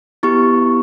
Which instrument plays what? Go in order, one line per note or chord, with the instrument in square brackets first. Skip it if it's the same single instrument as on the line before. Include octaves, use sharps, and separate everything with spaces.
[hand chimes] B3 E4 G4 C#6